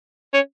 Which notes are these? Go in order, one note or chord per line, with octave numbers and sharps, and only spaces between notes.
C#4